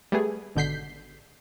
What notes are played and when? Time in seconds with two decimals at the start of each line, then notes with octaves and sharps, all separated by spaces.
0.12 G3 A3 B3 G#4
0.55 G#1 B2 D3 G6 B6 C7